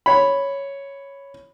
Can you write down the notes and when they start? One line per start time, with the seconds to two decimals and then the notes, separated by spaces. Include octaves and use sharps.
0.06 C#5 B5